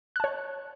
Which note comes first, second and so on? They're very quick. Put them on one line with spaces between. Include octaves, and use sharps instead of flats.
F#6 A5 C#5